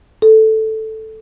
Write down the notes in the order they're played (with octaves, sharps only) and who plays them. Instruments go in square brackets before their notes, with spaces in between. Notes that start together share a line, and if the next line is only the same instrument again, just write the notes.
[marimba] A4